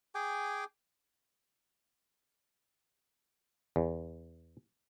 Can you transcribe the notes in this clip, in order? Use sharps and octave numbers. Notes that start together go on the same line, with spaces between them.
G#4 G5 G#5 D6
E2